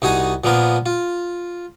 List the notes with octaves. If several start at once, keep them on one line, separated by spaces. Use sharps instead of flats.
C2 D#4 F#4 G#5 D#6
A#2 F3 A#3 B3 A#4
F4